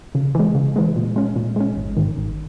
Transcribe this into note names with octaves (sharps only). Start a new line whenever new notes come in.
C#3
E3 G#3
C#3
E3 G#3
A#2
G#3 C#4
A#2
G#3 C#4
G#1
G#2 D#3
G#1